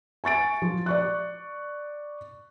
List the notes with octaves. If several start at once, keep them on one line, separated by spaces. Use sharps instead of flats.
G#5 C#6 A6 D7
F3
D5 C#6 F#6